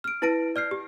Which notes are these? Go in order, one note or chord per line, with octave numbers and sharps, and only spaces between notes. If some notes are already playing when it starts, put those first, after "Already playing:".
F6 D7
E4 B4 A5 A#6 D7
D5 F6 G6 C7
G4